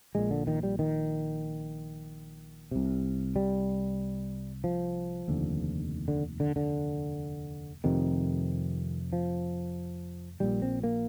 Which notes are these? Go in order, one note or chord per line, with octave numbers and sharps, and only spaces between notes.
A#1 A#2 G#3
D3
D#3
G3
D#3
C2 C3
G3
F3
F1 D#2 D3
D3
D3
D3
F1 F2 C3 D#3
F3
A#1 A#2 G3
C4
A#3